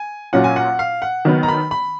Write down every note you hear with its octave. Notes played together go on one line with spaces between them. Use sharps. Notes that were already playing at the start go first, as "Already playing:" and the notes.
Already playing: G#5
A#2 F#3 C#4 F4 F#5
G#5
F#5
F5
F#5
D#3 F#3 B3
A#5
B5
B5